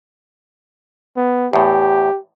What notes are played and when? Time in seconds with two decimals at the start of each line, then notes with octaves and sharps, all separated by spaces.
1.17 B3
1.53 E2 A2 G4